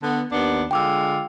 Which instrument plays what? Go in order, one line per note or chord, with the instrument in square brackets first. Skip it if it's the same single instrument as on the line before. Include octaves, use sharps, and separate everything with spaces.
[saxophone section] D3 B3
D#2 B3 D4
[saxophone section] D3 G#3 F4 [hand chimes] G5 D6 E6